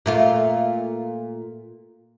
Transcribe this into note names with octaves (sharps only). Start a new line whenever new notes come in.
A#2 A3 F4